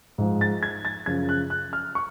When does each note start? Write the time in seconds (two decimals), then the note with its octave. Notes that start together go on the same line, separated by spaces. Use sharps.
0.18 G#2 F3 G#3
0.41 A6
0.63 G#6
0.85 A6
1.06 F#2 C#3 F3 G#6
1.29 F#6
1.50 F#6
1.73 F6
1.95 C#6